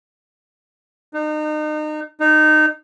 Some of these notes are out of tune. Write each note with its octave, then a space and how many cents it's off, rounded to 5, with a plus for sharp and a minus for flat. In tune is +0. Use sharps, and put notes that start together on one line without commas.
D#4 -35
D#4 -20